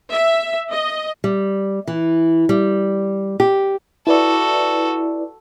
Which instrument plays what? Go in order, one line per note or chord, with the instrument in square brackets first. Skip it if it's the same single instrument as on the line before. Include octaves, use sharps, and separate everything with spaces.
[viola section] E5
D#5
[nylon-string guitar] G3
E3
G3
G4
[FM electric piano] E4 B4 D5 [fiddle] F#4 A4